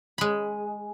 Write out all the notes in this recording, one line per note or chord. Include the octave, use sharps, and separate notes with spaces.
G#3 B5